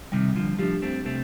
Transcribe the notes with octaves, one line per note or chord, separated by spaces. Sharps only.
C3 D#3 G3
D3 F3
F3 A3 D4 G4
A3 C4
C3 A3 C4